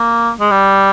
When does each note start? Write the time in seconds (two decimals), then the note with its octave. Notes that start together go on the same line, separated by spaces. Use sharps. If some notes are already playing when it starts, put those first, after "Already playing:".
Already playing: A#3
0.40 G#3
0.51 G3